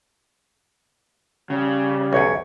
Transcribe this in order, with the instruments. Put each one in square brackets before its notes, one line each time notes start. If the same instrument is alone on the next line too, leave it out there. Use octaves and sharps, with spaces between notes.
[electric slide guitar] C#3 [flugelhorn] G3
[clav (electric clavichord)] B1 E2 [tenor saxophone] C#5